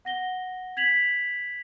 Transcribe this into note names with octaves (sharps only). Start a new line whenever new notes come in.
F#5 A#6 G7
G#6 B6 F7 F#7